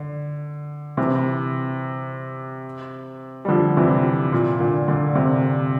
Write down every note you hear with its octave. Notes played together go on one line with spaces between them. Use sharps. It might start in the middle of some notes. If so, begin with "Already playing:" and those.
Already playing: D3
C3 E3
G3
D3 F3
C3 E3
A#2
A#2 D3
A#2 D3
C3